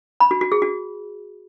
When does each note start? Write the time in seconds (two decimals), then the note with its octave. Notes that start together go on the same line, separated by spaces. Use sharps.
0.20 B5
0.31 F#4
0.41 F#4
0.52 G#4
0.62 F#4